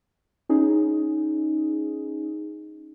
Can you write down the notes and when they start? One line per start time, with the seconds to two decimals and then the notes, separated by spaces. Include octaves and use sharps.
0.49 C#4 D#4 G#4